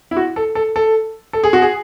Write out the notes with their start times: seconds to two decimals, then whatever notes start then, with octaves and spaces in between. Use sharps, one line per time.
0.11 E4
0.17 F#4
0.36 A4
0.55 A4
0.76 A4
1.33 A4
1.44 G#4
1.53 F#4
1.62 G#4